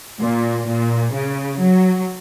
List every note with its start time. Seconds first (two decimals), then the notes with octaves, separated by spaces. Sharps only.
0.21 A#2
0.67 A#2
1.13 C#3
1.60 F#3